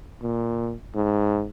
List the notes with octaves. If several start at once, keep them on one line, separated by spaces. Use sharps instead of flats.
A#2
G#2